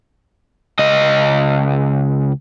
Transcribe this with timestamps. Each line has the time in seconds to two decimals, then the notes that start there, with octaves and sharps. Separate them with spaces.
0.79 C#2 D#5